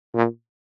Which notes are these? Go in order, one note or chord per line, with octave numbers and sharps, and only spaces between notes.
A#2